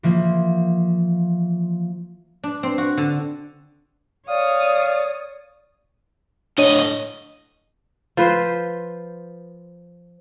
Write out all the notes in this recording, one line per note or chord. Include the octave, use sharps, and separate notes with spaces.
E3 F3 A#3
D4
C4
F#4
D3
C#5 D5 F5 D#6
A2 D4 C#5 D#5 D#7
F3 B4 C5